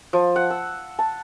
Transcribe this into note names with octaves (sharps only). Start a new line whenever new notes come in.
F3
F#5
E6
A5